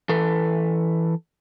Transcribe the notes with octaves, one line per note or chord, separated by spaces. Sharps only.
E3 A4 B4